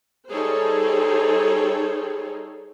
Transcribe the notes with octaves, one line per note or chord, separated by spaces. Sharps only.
G3 D#4 G#4 A4 C5 C#5